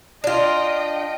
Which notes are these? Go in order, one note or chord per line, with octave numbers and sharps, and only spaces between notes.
D4 F4 D#5 G5